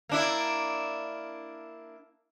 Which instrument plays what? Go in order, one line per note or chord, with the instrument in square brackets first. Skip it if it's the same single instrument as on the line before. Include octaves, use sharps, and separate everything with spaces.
[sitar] A#3 D4 E4